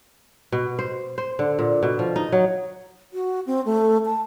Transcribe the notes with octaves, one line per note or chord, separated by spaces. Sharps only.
B2
C5
C5
D3
A#2
B2
F3
D#4
F#3
F#4
C4
A3
A5